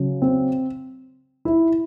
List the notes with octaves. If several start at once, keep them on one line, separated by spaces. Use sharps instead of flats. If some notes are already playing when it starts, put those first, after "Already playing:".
Already playing: C#3 F#3
C4
E4